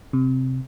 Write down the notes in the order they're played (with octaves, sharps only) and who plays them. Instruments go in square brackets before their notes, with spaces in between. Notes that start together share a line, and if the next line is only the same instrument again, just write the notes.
[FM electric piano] C3